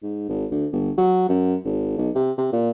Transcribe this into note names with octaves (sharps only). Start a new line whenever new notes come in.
G#2
G#1
D2
G1
F#3
F#2
G#1
B1
C3
C3
A#2